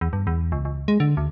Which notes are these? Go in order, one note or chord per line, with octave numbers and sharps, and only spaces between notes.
E2
G2
E2
C#2
C#2
G#3
D3
D2